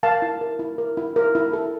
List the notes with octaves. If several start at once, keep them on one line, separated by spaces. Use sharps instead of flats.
A#4 F5 A5
E4
A#4
E4
A#4
E4
A#4
E4
A4